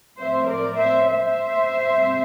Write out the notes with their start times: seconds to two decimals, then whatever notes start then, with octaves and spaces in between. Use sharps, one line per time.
0.20 A2 F3 C4 C5 E5
0.48 A#4 D5
0.77 C5 E5
1.06 C5 E5
1.93 C3 G3 C4